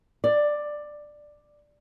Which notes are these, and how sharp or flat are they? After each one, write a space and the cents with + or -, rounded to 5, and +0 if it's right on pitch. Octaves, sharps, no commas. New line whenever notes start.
D5 +10